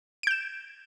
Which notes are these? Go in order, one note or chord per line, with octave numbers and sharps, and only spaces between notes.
G6 D7 E7